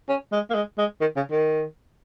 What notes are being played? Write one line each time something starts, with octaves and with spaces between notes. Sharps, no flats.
C#4
G#3
A#3
G#3
G#3
D#3
C#3
D#3